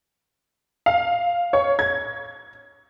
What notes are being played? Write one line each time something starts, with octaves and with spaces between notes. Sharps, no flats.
F5
C#5
G#6